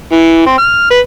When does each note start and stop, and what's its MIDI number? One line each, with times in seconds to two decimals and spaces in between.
0.12 0.42 52
0.46 0.56 60
0.58 0.88 89
0.91 0.99 71